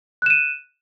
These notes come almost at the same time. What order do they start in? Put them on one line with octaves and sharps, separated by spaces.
F#6 E7 D#7